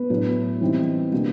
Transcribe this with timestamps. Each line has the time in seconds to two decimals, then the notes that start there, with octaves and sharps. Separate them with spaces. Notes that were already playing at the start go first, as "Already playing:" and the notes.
Already playing: B3 B4
0.10 A2 F#3 A3 D4
0.61 E3 G3 C4 D#4
1.12 B2 G3 A#3 D4